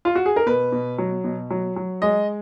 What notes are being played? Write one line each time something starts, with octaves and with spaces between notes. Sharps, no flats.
F4
F#4
G#4
A#4
B2 B4
B2
F#3
B2
F#3
F#3
G#3 D#5